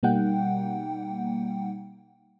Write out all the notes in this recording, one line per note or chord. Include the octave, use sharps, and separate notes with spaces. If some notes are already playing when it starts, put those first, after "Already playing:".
B2 G3 A#3 D#4 F#5 G5